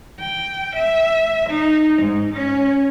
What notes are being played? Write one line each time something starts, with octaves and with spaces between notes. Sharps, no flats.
G5
E5
D#4
G#2
C#4